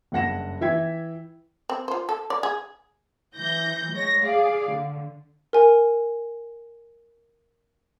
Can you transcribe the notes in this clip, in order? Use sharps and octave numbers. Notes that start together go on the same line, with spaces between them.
F#1 G2 F#5 A#6 E7
E3 E5 G5 G#6 B6
C4
F4 C5
A4
D5
G#4
E3 G6 A#6
G#3 C#5 A#6
G#4 D5 F5
D3
A#4 G#5